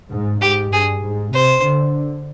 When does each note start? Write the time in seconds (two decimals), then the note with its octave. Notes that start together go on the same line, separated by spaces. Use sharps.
0.11 G#2
0.41 G#2 G4
0.73 G2 G#4
1.04 G#2
1.34 C3 C5
1.65 D3